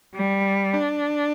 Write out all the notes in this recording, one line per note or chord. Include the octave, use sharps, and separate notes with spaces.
G3
D4